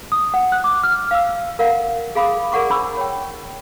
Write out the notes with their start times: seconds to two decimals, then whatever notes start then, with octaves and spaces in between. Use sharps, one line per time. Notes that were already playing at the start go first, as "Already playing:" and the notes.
0.12 D#6
0.34 F#5
0.52 F#6
0.64 D6
0.83 F6
1.11 F5 E6
1.59 A#4 F5 F#5
2.15 G#4 F5 B5 D6 D#6
2.52 G#4 A#4 D5 F#5 C#6 D6
2.70 D4 C5 B5 C#6 E6
2.97 C#5 G5